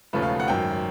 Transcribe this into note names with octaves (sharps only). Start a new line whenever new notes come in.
E1 D#2 C#3 F3 A3 B4
F5
F#5
G#1 F#2 D#3 G5